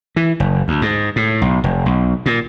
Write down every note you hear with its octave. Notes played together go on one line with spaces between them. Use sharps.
E3
F#1
D2
G#2
A2
B1
F1
B1
A#2